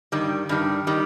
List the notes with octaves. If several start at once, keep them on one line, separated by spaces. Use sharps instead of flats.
G2 D#3 G3
G2 D#3 G3
D#3 G3